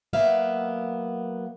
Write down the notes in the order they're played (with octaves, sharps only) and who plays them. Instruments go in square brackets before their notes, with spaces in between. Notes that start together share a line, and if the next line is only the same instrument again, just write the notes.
[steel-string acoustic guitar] F#3 A#3 B3 E5 F5